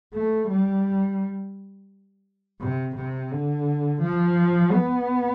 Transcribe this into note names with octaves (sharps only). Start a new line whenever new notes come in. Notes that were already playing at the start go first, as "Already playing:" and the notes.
A3
G3
C3
C3
D3
F3
B3